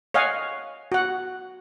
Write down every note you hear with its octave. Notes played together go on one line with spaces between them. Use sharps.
C#5 D#5 F5 F#5 G#5
F#4 F#5